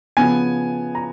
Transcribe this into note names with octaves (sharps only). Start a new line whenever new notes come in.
C#3 F3 B3 G#5
A#5